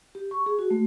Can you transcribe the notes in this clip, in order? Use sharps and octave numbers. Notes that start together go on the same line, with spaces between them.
G4
C#6
G#4
F#4
A3